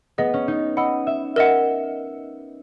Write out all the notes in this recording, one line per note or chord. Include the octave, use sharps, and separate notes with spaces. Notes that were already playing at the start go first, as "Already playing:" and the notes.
B3 G#4 D#5 F#5
C#4
D#4
D#5 F#5 B5 E6
E5
A#4 D#5 E5 F#5